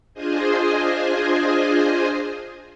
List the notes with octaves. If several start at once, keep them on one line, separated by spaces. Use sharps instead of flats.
D4 F4 G#4 C5 D#5 G#5